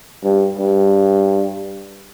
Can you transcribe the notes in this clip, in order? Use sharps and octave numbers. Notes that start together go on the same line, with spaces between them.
G2
G2